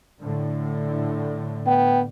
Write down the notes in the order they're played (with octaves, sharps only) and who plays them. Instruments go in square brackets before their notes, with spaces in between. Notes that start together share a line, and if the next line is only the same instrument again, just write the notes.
[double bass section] A2 D3
[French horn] B3 [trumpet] G5